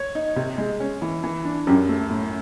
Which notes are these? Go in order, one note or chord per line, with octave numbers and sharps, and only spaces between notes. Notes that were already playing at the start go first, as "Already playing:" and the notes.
Already playing: C#5
D#4
C3
G#3
C#4
E3
E3
D4
F#2 G4
A3
A2